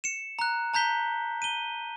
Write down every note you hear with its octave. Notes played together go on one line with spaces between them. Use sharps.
C#7 E7
A#5 F#6
A5 A#5 G6 B6 G7
D#7 G7